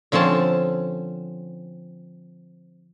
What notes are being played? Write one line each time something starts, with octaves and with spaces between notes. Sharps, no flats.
D3 F3 C4 C#4 A5